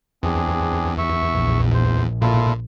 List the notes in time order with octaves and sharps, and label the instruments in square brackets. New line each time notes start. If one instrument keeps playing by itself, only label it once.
[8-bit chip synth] E2 [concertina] C4 D4 G#4
[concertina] E5 C#6
[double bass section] A#1
[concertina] C5
[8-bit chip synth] A#2 [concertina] E4 F4 A4